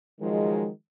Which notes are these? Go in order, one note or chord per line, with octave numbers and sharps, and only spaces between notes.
D#3 F3 F#3 G#3